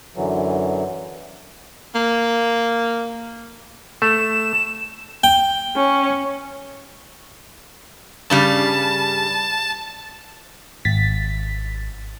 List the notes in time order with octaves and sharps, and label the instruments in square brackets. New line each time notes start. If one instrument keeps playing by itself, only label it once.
[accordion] F#2 D3 E3 F#3
[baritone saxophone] A#3
[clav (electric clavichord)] A3 [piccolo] E7
[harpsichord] G5
[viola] C#4
[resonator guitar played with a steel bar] G2 C#3 G3 [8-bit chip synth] A5
[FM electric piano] G#1 A6 B6